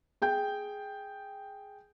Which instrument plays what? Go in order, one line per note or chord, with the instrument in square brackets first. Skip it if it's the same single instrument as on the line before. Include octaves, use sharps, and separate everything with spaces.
[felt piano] G#4 G5 G6